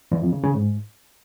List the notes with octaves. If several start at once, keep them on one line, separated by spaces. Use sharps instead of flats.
E2
F2
C#3
C#3
G#2